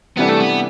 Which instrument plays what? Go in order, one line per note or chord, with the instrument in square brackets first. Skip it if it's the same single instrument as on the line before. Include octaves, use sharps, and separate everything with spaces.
[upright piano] C3 E3 G3 D4 A4 [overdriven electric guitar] B3
[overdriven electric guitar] A3
B3